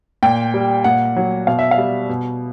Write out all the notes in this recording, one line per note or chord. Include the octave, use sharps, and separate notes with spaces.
A#2 G5
G3
A#2 F#5
F#3
B2 F5
E5
F5
G3
B2